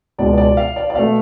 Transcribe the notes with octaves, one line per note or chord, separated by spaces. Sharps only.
C#2 B2 G#3 B3 D5
D5
F5
D5
D5
B2 A3 F5